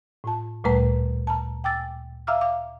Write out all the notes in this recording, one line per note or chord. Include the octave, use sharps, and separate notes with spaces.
A2 F4 A5
D2 A#2 G3 A3 B4 A#5
A5 A#5
G5 G#5 D6 E6 A6
E5 F5 A#5 D6 E6 F6
F5 D6